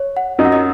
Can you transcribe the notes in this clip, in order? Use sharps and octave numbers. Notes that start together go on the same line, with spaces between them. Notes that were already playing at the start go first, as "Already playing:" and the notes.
Already playing: C#5
F#5
F#2 F#3 D#4 D#5
F#5
D#5